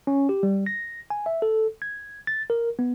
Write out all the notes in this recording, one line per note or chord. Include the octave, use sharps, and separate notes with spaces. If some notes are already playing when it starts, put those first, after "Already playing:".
C#4
G4
G3
A#6
G#5
E5
A4
G#6
A6
A#4
B3